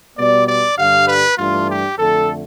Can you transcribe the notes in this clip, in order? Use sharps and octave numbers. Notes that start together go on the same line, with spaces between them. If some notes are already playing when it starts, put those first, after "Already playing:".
B2 G3 B3 D5
D5
G2 D3 G3 D4 F5
B4
G2 E3 A3 D4 F4
G4
F2 D3 A3 A4